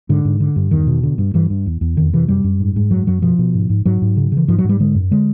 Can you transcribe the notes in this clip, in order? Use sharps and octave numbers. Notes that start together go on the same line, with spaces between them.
G#2 D3
G#2
D3
G2
E2 D#3
B2
D3
G2
G2 E3
G2
E2
E2
F2 D#3
C3 E3
F#2 G3
F#2
G#2
G#2
F#2 F#3
F#2 F#3
B2 F3
B2
G#2
G#2
G#2 F#3
G#2
C#3
C#3 E3
G#2 F3
F#3
G#2
G3
D3 G#3
F#2
D3 G#3